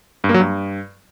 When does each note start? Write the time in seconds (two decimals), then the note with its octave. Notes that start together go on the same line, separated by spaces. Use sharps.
0.24 G2
0.29 A#3
0.34 F#3
0.40 G2